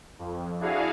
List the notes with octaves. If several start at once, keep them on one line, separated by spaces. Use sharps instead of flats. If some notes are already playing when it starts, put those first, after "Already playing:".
F2
D4 E4 F#4 G#4 F5